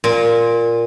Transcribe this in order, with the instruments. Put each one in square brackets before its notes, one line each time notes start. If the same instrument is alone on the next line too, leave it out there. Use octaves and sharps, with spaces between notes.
[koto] A#2